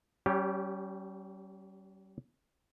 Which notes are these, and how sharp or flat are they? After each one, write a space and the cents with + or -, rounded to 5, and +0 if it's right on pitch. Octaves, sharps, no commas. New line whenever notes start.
G3 -35 C#4 +0 G4 +0